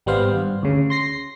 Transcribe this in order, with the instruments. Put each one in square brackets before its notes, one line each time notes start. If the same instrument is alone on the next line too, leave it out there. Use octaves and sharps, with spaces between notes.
[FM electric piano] G#1 G3 B3 C5 F5
G2
D2 C#3
C6 A#6 C7